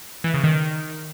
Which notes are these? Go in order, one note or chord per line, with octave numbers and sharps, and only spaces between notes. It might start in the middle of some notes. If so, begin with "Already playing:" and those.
E3
C#3
D#3